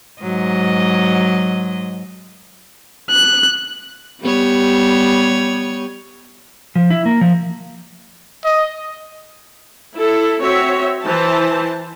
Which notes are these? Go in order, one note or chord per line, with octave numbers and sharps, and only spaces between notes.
G#2 F#3 D#5
F#6
G3 B3 C#5
F3
E4
A#3
F3
D#5
E4 A4
C4 F#4 C#5 E5
E3 C5 A5